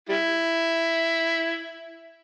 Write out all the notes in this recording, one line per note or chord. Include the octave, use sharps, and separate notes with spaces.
G3 E4